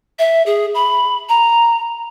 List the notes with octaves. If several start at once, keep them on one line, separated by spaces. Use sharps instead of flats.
E5
G#4
B5
A#5